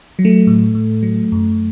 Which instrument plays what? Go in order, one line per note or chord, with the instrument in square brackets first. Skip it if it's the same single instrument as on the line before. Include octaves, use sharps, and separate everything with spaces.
[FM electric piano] F#3
A3
A2
A2
F#3
F#2